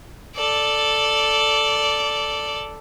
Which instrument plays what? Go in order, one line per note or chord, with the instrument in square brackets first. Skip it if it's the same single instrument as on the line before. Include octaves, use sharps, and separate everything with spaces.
[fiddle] A4 D5